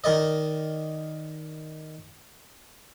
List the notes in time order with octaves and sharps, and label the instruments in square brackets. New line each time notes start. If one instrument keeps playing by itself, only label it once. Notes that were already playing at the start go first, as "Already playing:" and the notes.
[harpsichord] D#3 A#4 D5 D#5